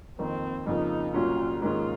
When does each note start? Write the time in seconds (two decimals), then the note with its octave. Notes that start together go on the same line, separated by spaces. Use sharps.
0.19 F2 D#3 A#3 C4
0.67 F2 C#3 F3 A#3 D#4
1.14 C2 A#2 F#3 C#4 F4
1.62 G#2 D#3 A#3 C#4 F4 G#4